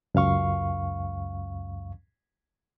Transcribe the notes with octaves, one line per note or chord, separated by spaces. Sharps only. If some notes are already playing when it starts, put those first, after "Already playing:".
C#2 F#2 F5 C#6